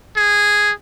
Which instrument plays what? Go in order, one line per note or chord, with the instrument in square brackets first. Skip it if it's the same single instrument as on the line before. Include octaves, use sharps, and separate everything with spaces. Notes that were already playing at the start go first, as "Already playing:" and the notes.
[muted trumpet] G#4